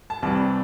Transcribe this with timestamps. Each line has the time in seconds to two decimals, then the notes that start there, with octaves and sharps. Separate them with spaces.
0.10 A5
0.22 C2 C3 E3 G3 A5